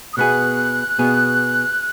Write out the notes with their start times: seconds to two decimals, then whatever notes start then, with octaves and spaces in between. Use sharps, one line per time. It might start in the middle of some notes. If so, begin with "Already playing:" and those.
0.13 D#6
0.17 B2 B3 G#4 F#6
0.99 B2 B3 G#4